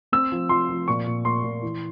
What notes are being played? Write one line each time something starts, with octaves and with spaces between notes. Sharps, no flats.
C4 E6
F3
F3 C6
F3
A#2 C#6
A#2
A#2 C6
A#2
E3